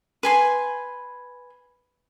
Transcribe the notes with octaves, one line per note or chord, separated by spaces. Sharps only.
B4 G#5 C6